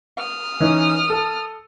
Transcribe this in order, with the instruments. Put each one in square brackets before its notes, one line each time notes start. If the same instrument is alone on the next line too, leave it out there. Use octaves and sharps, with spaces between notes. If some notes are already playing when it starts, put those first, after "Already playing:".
[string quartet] D#6 F6
[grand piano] E3 C#4 D#4
A4 A5